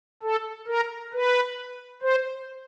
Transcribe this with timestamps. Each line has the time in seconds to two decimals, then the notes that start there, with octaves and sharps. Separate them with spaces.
0.23 A4
0.67 A#4
1.13 B4
2.02 C5